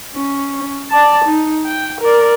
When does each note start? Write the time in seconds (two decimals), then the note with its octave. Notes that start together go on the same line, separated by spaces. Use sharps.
0.14 C#4
0.90 D5 A5
1.25 D#4
1.65 G5
2.01 A#4 D5